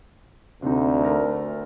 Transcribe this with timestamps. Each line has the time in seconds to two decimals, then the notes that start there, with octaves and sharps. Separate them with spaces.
0.62 D2 C3 D#4
1.01 A3 A#4